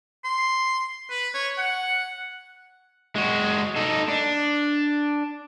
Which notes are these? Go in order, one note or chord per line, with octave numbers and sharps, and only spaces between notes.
C6
B4
C#5
F#5
G#3 F#4
D#4 A4
D4